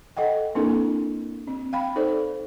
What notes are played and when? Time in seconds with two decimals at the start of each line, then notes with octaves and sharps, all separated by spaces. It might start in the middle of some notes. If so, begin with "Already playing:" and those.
0.17 A4 D#5 F#5 G5
0.55 A#3 C4 D4 E4 A4 A#4
1.47 C4
1.73 F5 G5 B5
1.96 D#4 A4 C5 D5